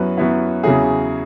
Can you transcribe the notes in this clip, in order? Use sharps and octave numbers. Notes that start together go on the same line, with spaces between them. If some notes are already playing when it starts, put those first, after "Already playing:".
Already playing: F#2 F#3 B3 E4 B4
F#2 F#3 B3 E4
E2 C#3 F#3 E4 G#4